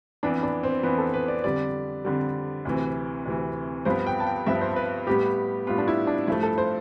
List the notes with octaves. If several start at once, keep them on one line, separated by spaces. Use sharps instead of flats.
F2 E3 B3 D4
D4
C4
F2 E3 B3
A4
B4
D5
F2 D3 G3 D5
F2 D3 G3
D2 C3 E3
D2 C3 E3
G2 F3 B3 C5
G5
A5
G5
G2 F3 B3 E5
C5
B4
A2 G3 B3 G4
A2 G3 B3 F4
D4
E4
D4
G2 F3 A3 E4
A4
C5